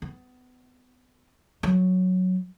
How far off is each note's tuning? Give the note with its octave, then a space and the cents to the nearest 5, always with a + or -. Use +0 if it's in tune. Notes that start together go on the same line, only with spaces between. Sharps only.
B3 +25
F#3 -5